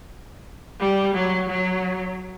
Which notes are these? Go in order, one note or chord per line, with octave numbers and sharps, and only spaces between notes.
G3
F#3
F#3